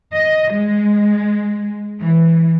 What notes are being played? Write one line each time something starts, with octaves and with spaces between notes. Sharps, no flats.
D#5
G#3
E3